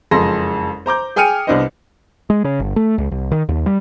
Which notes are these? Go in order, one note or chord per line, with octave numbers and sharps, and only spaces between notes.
F#1 F2 G#3 A4 C6 A#6
C5 A#5 D6 G6
G#4 G5 G#5 F6 C#7 D#7
C2 B3 D4 B4 C5 D#5
G#3
C#3
G1
A3
C#2
C2
D#3
D#2
G3